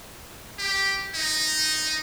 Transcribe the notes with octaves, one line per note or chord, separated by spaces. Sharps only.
G4
D#4